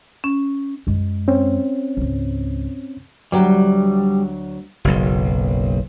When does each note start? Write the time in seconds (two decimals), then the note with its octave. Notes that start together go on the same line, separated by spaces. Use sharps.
0.24 C#4
0.87 F#2 G#3
1.28 C4 C#4
1.97 C#2 G#2
3.32 D2 F#3 G3 G5
4.84 F#1 B1